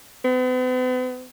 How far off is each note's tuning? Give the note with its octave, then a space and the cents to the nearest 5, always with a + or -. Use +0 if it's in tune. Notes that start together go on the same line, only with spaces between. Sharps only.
B3 +45